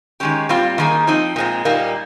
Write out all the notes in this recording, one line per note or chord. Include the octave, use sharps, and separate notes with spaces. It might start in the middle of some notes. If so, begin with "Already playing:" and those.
D#3 G#3 C#4 G4
A#2 G3 C4 F4
D#3 A#3 D#4 G#4
F3 C4 D#4
A#2 G#3 C4
A#2 G3 A#3 D#4